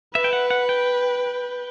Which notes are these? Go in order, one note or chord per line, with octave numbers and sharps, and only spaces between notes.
B4 E5
G5
F#5
F#5
G5